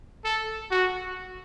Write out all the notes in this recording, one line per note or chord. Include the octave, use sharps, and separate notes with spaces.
A4
F#4